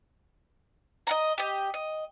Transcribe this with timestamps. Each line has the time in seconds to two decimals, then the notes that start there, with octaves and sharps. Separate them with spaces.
1.07 D#5 F#5 A#5
1.38 G4 D#5
1.74 D#5